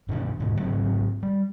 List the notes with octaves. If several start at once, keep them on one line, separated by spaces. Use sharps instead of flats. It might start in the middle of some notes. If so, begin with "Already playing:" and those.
G2 B2 D#3 D4
D2 G#2 B2
G#2 C#3 F#3 C4
G3